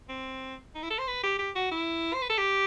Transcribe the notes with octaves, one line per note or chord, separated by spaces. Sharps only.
C4
D#4
E4
A4
C5
B4
G4
G4
F#4
E4
C5
B4
A4
G4